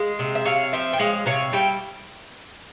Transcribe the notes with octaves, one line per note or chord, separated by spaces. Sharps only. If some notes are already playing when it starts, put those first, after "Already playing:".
Already playing: G#3 F5
C3
E5
C3 C#5 F5
F3 E5 G5
G5
G#3 C#5 F5
C3 C#5 F5
G3 E5 G5